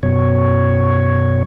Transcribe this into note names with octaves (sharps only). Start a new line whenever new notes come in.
F#2 B2 C#5